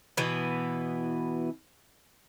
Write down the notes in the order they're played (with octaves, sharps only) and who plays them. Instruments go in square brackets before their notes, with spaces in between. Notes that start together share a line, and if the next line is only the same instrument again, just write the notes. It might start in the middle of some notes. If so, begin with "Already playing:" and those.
[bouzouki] B2 E3 B3